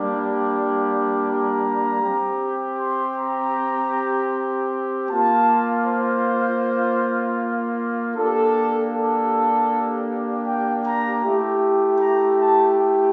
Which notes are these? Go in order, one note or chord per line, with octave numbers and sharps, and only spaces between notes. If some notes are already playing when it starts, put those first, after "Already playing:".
Already playing: G3 A#3 D4 G4
A#5
C4 G4
C6
A#5
A#3 F4 A5
C5
A#3 D4 G4 A4
A4
G5
A#5
A3 E4 G4
A#5
A5
G5